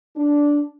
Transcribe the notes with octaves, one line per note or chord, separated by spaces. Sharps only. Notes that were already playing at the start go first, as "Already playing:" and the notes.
D4